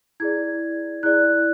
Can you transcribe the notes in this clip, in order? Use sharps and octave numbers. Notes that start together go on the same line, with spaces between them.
E4 G#4 D5 G#6
E4 G#4 D5 F#6